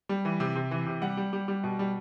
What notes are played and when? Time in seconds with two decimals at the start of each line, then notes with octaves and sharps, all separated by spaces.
0.09 G3
0.25 E3
0.40 C3
0.55 C3
0.71 E3
0.86 C3
1.02 G3 F#5
1.17 G3
1.33 G3
1.48 G3
1.64 B2
1.79 G3